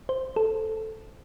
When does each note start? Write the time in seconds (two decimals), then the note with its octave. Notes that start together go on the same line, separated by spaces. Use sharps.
0.09 C5
0.36 A4